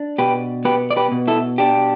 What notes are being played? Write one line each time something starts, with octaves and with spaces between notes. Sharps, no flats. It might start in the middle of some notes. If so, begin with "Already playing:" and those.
Already playing: D4
B2 G4 B4
B3 G4 B4
D5
G4 B4
B2
E4 A4
D4 G4